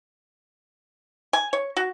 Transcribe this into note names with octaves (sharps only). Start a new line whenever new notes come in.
G#5
C#5
F#4